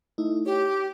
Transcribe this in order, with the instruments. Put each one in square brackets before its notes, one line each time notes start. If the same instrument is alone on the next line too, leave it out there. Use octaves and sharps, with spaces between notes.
[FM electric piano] A3 D#4 E4
[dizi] G4 [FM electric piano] C#5